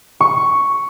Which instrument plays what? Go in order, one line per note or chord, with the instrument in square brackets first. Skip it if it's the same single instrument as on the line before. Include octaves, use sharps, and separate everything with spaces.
[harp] C#6